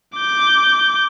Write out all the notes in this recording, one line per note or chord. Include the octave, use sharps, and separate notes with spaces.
D6 G6